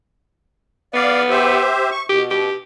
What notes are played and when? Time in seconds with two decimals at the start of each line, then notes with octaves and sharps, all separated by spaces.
0.94 B3 D5 F5
1.30 G4 C5 E5
1.91 C#6
2.09 B2 G4
2.31 G4